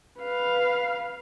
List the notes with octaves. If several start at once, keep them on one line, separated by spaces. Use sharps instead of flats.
B4 F5